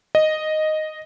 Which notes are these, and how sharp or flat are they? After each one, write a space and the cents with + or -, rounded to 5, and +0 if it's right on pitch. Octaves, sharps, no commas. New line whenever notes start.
D#5 -5